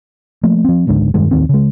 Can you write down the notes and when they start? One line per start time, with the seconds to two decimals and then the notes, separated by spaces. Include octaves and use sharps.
0.43 F3 A3 A#3
0.64 F3 C4
0.87 G#1 C#2 G#2 D3
1.14 E1 G2 D#3 G#3
1.31 A1 D#2 D#3 C4
1.49 C#3 G#3